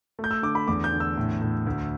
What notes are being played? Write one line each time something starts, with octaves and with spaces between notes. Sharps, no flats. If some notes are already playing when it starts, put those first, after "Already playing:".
A3
G6
E6
D3 D6
B5
E2 D6
G6
D3
E6
A2
A2
D2